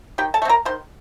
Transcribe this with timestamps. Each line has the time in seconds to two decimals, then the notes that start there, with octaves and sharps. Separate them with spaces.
0.18 D#3 G4 G5
0.34 A4 A5
0.42 A3
0.45 C4
0.49 A#4 A#5
0.65 D#3 C5 C6